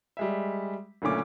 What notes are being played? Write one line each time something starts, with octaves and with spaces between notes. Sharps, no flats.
G3 G#3 E5
F#1 A#2 D3 A3 C#4 D6